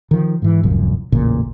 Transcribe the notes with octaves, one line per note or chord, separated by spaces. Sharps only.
D#3 F3
G#2 E3
D1 C2 F#2 F3
A1 E2 A#2 C#3